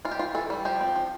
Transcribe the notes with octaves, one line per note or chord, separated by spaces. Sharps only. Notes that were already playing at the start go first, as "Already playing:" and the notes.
E3 F4
G4
E3 F4
E3 A4
G3
F3 G4
C4
F3